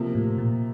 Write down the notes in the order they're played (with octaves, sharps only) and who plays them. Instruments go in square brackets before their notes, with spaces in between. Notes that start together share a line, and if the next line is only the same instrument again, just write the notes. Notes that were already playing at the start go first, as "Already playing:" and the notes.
Already playing: [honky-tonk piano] C3 F3 A#3
[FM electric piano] A2
A#2